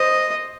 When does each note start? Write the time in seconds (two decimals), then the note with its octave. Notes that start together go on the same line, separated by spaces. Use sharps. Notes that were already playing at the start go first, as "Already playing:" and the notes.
Already playing: C5 D#5